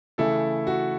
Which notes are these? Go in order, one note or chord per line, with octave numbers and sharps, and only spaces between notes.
C#3 E3 A3 E4 A4
F#4